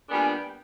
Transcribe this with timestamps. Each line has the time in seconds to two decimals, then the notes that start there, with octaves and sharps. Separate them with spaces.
0.09 A#2 G3 B3 D4 G#5
0.32 G5